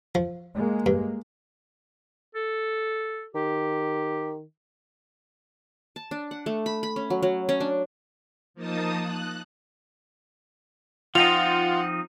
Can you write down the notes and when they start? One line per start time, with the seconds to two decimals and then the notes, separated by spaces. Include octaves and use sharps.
0.15 F3
0.55 G#3 A#3
0.86 G2
2.35 A4
3.34 D#3 G4
5.96 A5
6.11 D4
6.31 F#5
6.46 A3
6.66 B5
6.83 B5
6.96 C#4
7.10 F#3
7.23 F#3
7.49 C#4
7.60 D4
8.54 F3 A#3 D#4 A5 D#6
9.01 F#6
11.15 F3 C4 D#4 F4 F#5 F7